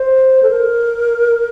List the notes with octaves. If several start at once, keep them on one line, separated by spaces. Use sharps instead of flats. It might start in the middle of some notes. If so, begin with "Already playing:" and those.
Already playing: C5
A4
A#4